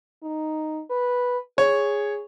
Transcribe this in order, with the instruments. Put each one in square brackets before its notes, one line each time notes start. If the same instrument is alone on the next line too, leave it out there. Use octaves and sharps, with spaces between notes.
[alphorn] D#4
B4
[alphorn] G#4 [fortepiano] C#5